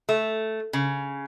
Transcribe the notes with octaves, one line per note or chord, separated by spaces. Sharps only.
A3
C#3